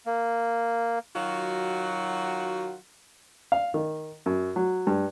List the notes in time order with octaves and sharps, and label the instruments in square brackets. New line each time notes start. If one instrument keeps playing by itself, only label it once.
[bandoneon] A#3
[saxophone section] D#3 F#3 F4 F#4
[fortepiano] F5
D#3
F#2
F#3
G2